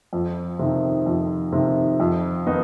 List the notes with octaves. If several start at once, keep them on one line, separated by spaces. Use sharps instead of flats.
F2
C3 D#3
F2
C3 D#3
F2
D#3 B3 D#4